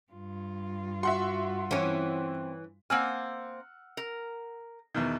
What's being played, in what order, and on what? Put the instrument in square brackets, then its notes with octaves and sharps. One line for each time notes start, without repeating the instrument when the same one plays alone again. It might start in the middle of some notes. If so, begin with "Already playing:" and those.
[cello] G2 F4
[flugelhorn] F#4 [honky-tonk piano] E5 F#5 C6
[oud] E3 C#4 [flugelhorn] C4
[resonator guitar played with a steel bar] A#3 C4 G#5 [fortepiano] F#5 E6 F6
[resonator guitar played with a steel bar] A#4
[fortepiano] E2 B2 D#3